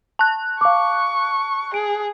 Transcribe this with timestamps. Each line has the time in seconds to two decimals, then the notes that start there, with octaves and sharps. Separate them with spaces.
0.19 A5 F#6
0.61 F5 C#6 D6
1.74 G#4 D7